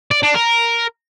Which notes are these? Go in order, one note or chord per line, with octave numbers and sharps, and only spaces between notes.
D5
D4
A#4